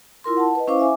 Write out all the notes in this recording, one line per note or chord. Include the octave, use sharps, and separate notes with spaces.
E4 F4 A#4 C6
F#5 A5
B4 D#5
C#4 E4 C5 F5 C#6 D6
E5 G#5 D6